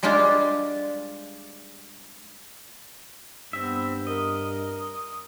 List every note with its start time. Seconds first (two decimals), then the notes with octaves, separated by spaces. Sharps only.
0.03 G3 G#3 D4 F4 G4
3.53 G2 B3 C4 E5
4.07 A#4 D#5